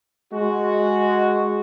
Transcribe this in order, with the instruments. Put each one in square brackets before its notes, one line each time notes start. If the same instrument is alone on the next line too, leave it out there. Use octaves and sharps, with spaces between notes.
[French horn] G#3 [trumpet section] F#4